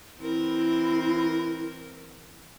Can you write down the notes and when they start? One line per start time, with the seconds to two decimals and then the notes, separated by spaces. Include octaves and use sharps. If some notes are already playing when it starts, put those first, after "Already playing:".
0.20 E3 C4 E4 A#4